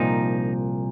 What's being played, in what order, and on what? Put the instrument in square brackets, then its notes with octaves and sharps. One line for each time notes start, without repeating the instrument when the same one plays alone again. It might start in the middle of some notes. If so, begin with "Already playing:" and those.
Already playing: [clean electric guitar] C2 A#2 F3 D#4